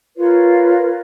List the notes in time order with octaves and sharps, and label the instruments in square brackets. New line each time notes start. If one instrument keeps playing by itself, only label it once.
[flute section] F4 A#4 B4 C#5